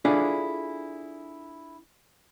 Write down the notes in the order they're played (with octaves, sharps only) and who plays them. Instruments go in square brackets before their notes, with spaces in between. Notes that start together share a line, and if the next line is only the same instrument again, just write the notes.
[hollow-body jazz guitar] D4 E4 F4 G#4 A4 D5